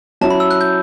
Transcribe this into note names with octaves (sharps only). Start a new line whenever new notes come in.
F#3 C#4 E4 A5
B5
E6
F#6
G6